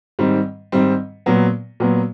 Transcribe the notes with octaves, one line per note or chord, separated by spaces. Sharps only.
G#2 D#3 G3 C4
G#2 D#3 G3 C4
A#2 F#3 B3
A#2 F#3 B3